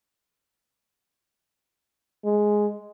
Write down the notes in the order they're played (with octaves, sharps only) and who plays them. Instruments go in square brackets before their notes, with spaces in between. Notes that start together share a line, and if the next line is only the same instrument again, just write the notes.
[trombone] G#3